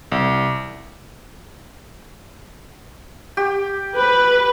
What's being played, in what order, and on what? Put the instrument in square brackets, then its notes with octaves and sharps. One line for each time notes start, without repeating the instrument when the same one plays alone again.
[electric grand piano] C2
[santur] G4
[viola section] B4